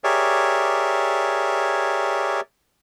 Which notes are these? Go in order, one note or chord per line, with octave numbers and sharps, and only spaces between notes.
G4 G#4 A#4 C#5 D5 E5